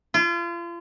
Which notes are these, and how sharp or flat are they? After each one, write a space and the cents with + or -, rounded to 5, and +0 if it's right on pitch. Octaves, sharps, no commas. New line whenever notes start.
F4 -35